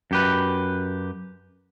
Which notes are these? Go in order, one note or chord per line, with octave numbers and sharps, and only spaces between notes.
F#2 G4 B4